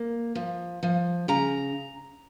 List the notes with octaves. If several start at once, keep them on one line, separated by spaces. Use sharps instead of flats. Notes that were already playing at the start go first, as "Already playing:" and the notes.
Already playing: A#3
F3
F3
C#3 A#5